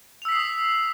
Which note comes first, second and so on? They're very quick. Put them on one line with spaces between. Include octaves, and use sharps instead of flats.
F7 E6 B6 C7 D#6